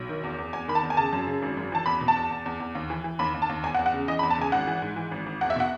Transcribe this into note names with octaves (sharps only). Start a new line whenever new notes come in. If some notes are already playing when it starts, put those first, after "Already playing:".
Already playing: B1
D#3
E2
E2
E2 G#5
D#3 B5
A5
E2
G#5
C#3 A5
F#2
C#3
G#1
F#2
E3 A5
E2 B5
B2
A5
E2
E2
E2
E2
D#2
E3
E3
D#2 B5
D#2
A5
D#2
E2 G#5
F#5
E2
F#5
C#3
E3 D#5
B5
E2
A5
C#3 G#5
G#1 F#5
E3
G#2
E3
G#1
G#1
E2 F#5
E5
B2 F#5